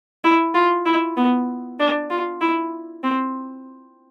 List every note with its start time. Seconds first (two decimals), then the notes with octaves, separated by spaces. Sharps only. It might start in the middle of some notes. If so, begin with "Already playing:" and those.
0.24 E4
0.54 F4
0.86 E4
1.17 B3
1.79 D4
2.10 F4
2.41 E4
3.04 C4